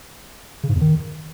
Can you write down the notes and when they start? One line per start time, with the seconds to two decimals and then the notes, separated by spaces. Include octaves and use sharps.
0.63 C#3
0.69 G#2
0.75 E2
0.81 D#3